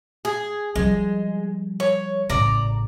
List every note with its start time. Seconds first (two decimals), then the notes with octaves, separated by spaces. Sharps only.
0.25 G#4
0.76 F3 G3 G#3
1.80 C#5
2.30 A1 C#3 D5 A#5